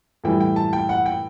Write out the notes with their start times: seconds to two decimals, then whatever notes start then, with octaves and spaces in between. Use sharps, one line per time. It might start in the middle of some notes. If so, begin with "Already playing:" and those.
0.24 A2 E3 G3 G5
0.40 G5
0.56 A5
0.73 G5
0.89 F#5
1.06 G5